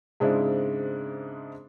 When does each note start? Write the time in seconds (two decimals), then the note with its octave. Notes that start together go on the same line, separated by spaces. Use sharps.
0.20 G#2 C#3 G#3 C4 D4 E4